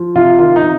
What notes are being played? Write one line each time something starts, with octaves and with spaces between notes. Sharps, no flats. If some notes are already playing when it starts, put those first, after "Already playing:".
Already playing: F3
C3 F4
D#3 F4
D#4
C3